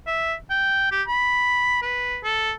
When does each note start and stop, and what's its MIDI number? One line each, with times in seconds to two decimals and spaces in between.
0.07 0.33 76
0.50 0.90 79
0.91 1.02 67
1.08 1.80 83
1.82 2.18 71
2.24 2.53 69